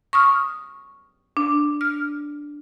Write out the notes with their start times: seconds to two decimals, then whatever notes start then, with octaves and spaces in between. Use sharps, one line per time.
0.13 C#6 D#6 F6
1.37 D4
1.81 F6